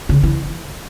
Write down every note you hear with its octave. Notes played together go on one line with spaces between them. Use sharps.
C#3
E3